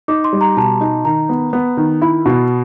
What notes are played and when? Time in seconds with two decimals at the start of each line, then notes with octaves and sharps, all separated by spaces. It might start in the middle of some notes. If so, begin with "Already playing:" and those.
0.08 D#4 D6
0.24 C6
0.33 G3
0.41 A#5
0.57 B2 A5
0.81 D#4
1.05 D#3 A#5
1.29 B3
1.53 B3
1.77 D#3
2.02 E4 B5
2.26 B2